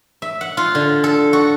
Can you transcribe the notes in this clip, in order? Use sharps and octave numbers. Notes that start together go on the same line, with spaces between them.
E5
F#5
F4
D3
A4
F#4